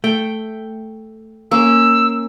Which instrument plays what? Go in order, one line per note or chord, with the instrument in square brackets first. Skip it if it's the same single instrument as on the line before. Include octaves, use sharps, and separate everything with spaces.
[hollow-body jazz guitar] A3 [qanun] G5
[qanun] A#3 C#4 [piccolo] E6